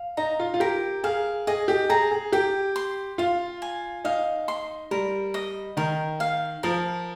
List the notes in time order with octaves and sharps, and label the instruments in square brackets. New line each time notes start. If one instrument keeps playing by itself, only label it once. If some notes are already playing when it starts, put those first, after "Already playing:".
Already playing: [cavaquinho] F5
[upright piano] D#4 [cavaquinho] A#5
[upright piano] F4
F4
[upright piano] G4 [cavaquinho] A#4
[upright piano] G#4 [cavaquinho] F5
[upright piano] G#4 [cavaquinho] D#5
[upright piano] G4
[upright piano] G#4 [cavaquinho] A#5
[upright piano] G#4
[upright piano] G4 [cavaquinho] G5
[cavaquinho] C6
[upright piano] F4 [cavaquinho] F5
[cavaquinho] G#5
[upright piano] D#4 [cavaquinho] F5
[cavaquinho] C6
[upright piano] G3 [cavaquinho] A#4
[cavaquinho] D#5
[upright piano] D#3 [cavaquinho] A#4
[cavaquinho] F5
[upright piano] F3 [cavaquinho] A#4